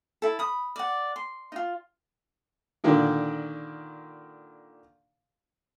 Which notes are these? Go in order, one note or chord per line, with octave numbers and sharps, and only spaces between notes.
E4 A4
B5 D#6
D5 F#5
C6
D#4 F4
A#2 D3 D#3 A#3 D#4